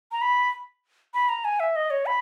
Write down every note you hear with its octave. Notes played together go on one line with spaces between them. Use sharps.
A#5
B5
B5
A#5
G#5
E5
D#5
C#5
B5